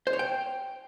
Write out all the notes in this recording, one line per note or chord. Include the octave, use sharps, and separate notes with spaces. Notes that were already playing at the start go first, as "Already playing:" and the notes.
C5
C#5
G5